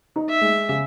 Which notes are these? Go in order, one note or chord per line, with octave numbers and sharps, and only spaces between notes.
D#4
E5
G#3
C#3